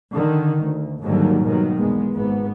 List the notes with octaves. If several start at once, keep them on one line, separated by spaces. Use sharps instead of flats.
D3 D#3
D2
D#2 G#2 D3 D#3 F#3 G3
B2 D#3 F#3
B1 E2 G#3 B3
G#1 G#2 B3